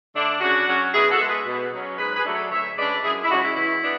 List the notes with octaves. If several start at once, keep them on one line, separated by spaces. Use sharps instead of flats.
D3 A3 D4
C#3 D4 F#4
F#3 C#4
B2 E4 G#4
F#4 A4
G#3 B3
G#4 B4
B2
F#3 C#4
G#2 G#4 B4
G#4 B4
F#3 A3 D4
A4 C#5
D2 C#5 E5
C#3 G#3 D4 B4 D5
F#2 E4 G#4
E4
C#3 G#3 C#4 D4 F#4
E4
E2 E4
B3 D4